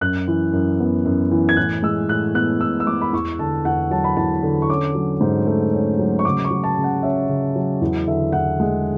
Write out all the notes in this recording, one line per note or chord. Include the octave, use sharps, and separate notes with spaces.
F#2 F#6
E3
F#2
B3
F#2
E3
G#6
A2 F#6
G#3 E6
A2 F#6
B3 F#6
A2 E6
E6
G#3 D6
B5
E2 C#6
D3 A5
E2 F#5
F#3 A5
B5
E2 A5
D3
C#6
C#4 D6
F#3
G#2
A3
C#4
F#3
C#6
C#3 D6
C#6
F#3
A5
C#3
F#5
C#4 E5
C#3
F#3
E2
D3 E5
E2 F#5
G#3